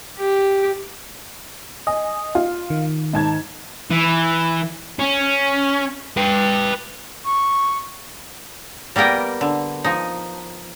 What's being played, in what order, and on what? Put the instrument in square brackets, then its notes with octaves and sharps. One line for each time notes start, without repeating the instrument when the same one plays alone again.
[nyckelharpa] G4
[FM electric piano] D#5 [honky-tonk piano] G#5
[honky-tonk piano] F4
[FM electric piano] D#3
[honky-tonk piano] G#2 A5 G#6
[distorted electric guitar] E3
C#4
B4 G5
[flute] C#6
[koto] G3 A#3 B3 A#4 G5
D3
F3 D#4